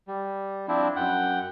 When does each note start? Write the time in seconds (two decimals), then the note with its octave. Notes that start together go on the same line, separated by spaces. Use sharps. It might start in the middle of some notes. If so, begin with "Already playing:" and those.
0.08 G3
0.68 F3 C4 D4 E4
0.96 F#2 F#5 G5